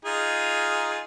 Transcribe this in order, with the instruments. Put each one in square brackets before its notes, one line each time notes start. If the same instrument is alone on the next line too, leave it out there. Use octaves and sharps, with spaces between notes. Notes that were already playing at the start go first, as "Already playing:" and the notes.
[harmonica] D#4 F4 G#4